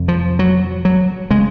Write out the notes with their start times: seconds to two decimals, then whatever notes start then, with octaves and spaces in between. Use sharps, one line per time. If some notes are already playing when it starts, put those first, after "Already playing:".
Already playing: F2 C3
0.08 F3
0.39 F#3
0.85 F#3
1.31 C#3 G#3